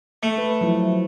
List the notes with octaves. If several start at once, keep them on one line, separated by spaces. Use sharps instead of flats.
A3
B4
F3 F#3 E4